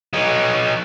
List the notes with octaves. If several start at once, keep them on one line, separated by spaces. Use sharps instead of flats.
F#3 D#4